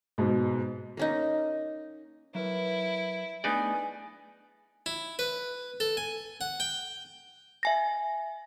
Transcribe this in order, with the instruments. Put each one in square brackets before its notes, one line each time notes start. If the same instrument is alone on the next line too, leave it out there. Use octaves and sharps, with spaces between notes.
[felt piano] G#2 B2
[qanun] A#3 C#4 D#4
[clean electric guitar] F#3 A#4 B4 [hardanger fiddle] E4
[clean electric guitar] A3 D4 G#4 [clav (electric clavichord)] B3 D#4 D5 [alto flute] G#5
[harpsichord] E4
B4
A4
G#5
F#5
G5
[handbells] E5 G#5 A#6